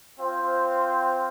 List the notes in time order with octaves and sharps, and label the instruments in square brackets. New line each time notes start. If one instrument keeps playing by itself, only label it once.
[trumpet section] C4 F4 C5 G5